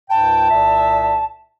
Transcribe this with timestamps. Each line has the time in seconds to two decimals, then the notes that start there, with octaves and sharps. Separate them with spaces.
0.10 C#2 G#2 G5 A5
0.49 C2 A#2 E5